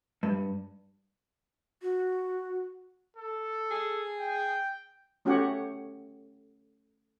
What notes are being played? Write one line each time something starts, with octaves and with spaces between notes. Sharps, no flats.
G2
F#4
A4
G#4
G5
A3 C#4 F#4 G4 C#5 F#5